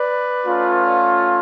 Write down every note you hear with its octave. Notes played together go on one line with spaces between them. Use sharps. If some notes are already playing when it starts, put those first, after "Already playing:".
Already playing: B4 D5
A3 C#4 F4